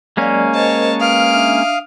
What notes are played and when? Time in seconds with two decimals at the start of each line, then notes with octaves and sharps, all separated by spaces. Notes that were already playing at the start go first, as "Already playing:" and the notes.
0.17 F#3 G#3 A#3 C#4 D5 F5
0.54 A#4 C5 C#5 D#5 A5
1.01 B4 F5 D#6 F6 D7
1.33 D4 E5